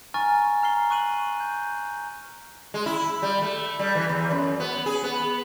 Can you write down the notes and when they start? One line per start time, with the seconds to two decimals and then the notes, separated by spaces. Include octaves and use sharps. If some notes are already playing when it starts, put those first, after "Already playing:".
0.14 G#5 A#5 C#6 F6 A6
0.63 A#5 F6 C7 G7
0.90 C#6 F#6 D#7 F#7
1.40 G6
2.74 G#3
2.86 E4
3.23 G3
3.42 A3
3.79 G3
3.95 E3
4.09 E2
4.31 F#2
4.60 B3
4.86 G#4
5.04 B3